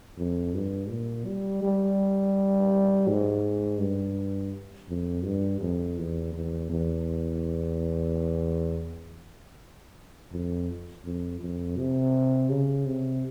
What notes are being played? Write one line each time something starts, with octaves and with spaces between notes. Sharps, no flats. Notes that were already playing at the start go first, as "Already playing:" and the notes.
F2
G2
A#2
G3
G3
G#2
G2
F2
G2
F2
E2
E2
E2
F2
F2
F2
C3
C#3
C3